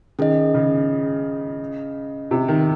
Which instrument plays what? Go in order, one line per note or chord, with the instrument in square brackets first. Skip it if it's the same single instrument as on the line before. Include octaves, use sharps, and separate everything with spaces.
[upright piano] D#3 [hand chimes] C#4 G#4 D#5
[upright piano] C#3
C3
D#3